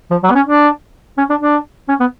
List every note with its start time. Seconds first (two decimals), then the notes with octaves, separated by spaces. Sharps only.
0.11 F3
0.23 F#3
0.30 B3
0.35 C#4
0.47 D4
1.17 C#4
1.30 D4
1.42 D4
1.88 C#4
2.00 B3